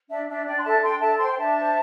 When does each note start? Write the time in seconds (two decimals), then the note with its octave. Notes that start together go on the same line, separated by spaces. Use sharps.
0.08 D4 E5
0.27 D4 E5
0.45 D4 D5 G5
0.58 C6
0.64 A4 E5 A5
0.82 D4 G5 C6
1.00 A4 E5 A5
1.18 C5 G5 C6
1.31 G5
1.37 D4 E5 A5
1.56 C5